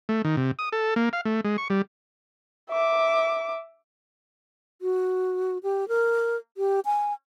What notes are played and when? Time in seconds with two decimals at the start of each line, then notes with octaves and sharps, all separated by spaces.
0.09 A3
0.25 D#3
0.37 C3
0.59 D#6
0.73 A4
0.96 A#3
1.13 F5
1.25 A3
1.45 G#3
1.58 C#6
1.70 G3
2.70 E5 D6
4.82 F#4
5.63 G4
5.88 A#4
6.57 G4
6.85 G#5